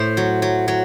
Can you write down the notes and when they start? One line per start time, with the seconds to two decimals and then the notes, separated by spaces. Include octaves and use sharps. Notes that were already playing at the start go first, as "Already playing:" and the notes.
Already playing: A2 C5
0.17 F#3
0.42 F#3
0.68 F#3